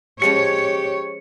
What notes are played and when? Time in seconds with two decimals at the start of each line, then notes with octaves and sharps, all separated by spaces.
0.22 F3 G#3 C#4 G4 C#5 C#7